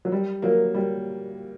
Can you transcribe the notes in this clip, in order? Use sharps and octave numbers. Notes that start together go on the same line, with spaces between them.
F#3
G3
F#3 A#3
G3